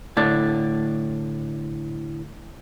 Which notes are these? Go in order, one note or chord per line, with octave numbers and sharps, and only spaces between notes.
A2 D3 D4 D5